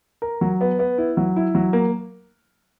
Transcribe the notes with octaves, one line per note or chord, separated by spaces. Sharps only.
A#4
F#3
B3
B3
E4
F#3
E4
F#3
A#3